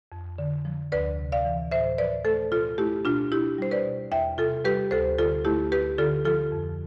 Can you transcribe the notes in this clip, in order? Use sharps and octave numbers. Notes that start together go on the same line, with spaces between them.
F2
D3
F3
D2 B4 D5
C3
D5 F5
E3
A2 C5 E5
F3 B4 D5
A3 A4 C5
B2 F4 A4
A3 E4 G4
B2 D4 F4
B2 E4 G4
G3 C5
B4 D5
B2
E2 E5 G5
C3 F4 A4
G3 G4 B4
D2 A4 C5
D3 F4 A4
A3 E4 G4
D2 G4 B4
D3 F4 A4
F3 F4 A4
F2